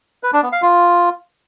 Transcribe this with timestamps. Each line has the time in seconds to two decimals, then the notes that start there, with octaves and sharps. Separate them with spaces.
0.23 B4
0.33 D4
0.43 B3
0.52 F5
0.62 F4